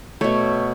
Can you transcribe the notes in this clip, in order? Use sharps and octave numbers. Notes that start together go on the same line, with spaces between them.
B2 A3 C#5